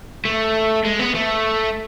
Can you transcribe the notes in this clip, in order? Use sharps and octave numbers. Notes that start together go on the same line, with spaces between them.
A3
G#3
B3
A3